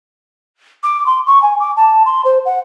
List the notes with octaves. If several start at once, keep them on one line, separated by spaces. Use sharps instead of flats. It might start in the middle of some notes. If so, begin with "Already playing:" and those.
D6
C6
C#6
G#5
D6
A5
C6
C5
F#5